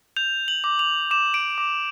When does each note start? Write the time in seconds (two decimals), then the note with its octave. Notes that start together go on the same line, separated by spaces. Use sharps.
0.16 G6 F7
0.48 F#7
0.64 D6
0.79 F7
1.11 D6 E7
1.34 D7
1.58 D6